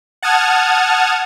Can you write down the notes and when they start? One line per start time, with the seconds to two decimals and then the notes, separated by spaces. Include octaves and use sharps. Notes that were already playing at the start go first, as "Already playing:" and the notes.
0.22 F#5 A5 D#6 F6 G#6